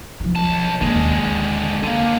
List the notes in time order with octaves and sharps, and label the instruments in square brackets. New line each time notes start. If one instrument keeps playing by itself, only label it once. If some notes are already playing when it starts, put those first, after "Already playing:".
[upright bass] F3 D#4
[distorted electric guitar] B1 A5
[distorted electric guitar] D3 G#3 [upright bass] A#3 C#4
[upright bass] D#2
[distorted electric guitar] D3 A#3 [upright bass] D4